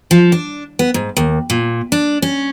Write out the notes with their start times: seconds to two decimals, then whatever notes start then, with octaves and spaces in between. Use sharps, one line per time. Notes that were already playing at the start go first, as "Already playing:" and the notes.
0.11 F3
0.32 D4
0.79 B3
0.94 G#2
1.17 D#2
1.50 A#2
1.92 D4
2.22 C#4